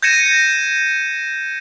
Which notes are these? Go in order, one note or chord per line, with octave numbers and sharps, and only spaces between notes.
G6 G#6 A#6 C#7 D#7 E7